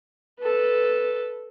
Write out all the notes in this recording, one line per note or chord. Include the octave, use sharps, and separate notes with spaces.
A4 B4